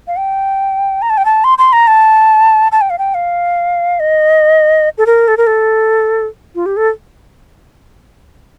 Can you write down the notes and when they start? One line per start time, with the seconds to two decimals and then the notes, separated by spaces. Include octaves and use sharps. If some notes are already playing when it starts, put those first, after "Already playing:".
0.08 F5
0.17 G5
1.02 A#5
1.10 A5
1.17 G5
1.25 A5
1.44 C6
1.58 C6
1.73 A#5
1.87 A5
2.72 A5
2.81 G5
2.90 F5
2.99 G5
3.15 F5
4.00 D#5
4.98 A4
5.06 A#4
5.28 A4
5.37 A#4
5.47 A4
6.55 F4
6.66 G4
6.77 A4